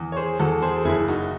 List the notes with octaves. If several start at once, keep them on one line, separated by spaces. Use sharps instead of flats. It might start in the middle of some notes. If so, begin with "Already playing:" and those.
Already playing: E2
C#5
G#4 C5
E2 F#4 A4
G#4 C5
A4
F#1 E4 G#4
D#4 F#4